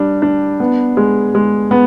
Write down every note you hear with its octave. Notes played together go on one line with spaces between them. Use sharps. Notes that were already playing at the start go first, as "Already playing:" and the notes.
Already playing: G3 D4
D4
B3
G#3
G#3
B3